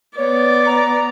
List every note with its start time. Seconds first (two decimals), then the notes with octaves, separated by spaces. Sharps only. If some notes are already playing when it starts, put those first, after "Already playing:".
0.18 B3 C#5 D5
0.66 A#5